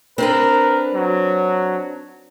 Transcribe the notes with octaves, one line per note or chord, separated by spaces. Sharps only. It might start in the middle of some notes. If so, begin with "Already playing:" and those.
C4 D4 A#4 B4
F#3